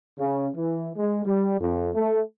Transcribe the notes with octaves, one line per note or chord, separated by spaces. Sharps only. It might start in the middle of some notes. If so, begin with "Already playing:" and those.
C#3
E3
G#3
G3
F2
A3